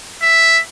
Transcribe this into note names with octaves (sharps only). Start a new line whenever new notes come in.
E5